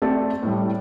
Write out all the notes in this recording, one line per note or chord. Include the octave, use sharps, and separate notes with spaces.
A3 C4 A4 D5
A2 G3